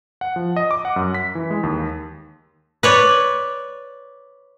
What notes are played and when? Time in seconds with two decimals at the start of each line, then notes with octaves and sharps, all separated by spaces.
0.21 F#5
0.36 F3
0.56 D#5
0.71 D6
0.85 F#5
0.96 F#2
1.14 B6
1.35 E3
1.51 G#3
1.63 D#2
2.83 B4 C#5 D5